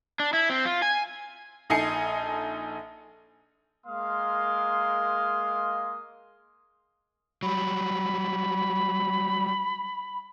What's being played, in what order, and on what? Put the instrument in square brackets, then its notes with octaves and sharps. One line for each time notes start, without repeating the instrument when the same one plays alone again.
[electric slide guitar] D4
E4
C4
F4
G#5
[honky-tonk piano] A#1 D#4 A4 G#5 C7 C#7
[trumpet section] G#3 A#3 A#4 F5 C6 D#6
[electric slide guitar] F#3 G3 [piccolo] B5